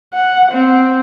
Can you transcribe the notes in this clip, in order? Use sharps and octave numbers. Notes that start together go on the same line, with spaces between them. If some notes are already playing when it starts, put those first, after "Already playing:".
F#5
C4